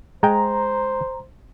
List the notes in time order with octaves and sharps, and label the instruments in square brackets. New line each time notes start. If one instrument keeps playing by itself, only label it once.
[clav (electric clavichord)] G#3 G5 [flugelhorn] C5 [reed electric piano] A#5